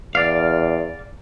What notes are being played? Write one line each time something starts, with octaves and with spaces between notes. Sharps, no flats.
E2 D5 F5